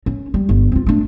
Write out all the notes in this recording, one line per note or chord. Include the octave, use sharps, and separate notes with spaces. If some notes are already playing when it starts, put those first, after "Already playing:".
C#4
G3
G1
C4 F4
A3 D4